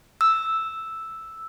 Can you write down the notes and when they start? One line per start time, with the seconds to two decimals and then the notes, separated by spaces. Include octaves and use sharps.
0.21 E6